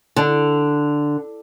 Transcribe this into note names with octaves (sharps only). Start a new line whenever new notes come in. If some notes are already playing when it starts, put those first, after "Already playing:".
D3